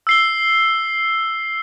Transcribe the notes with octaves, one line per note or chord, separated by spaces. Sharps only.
E6 C7 G7